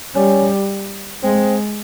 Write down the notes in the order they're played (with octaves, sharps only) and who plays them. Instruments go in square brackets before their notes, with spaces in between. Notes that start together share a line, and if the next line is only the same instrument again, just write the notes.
[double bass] G3 [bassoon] C#4
[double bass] G#3 [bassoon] C4